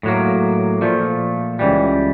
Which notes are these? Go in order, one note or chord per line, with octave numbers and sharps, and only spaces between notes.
A2 F#3 A#3
A#2 F3 A3
C#2 C#3 E3 G3